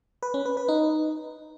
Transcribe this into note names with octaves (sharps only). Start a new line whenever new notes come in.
B4
C#4
B4
B4
D#4